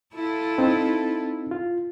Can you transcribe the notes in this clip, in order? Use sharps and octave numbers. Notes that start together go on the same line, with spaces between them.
E4 F4 A4
C4 D#4
F4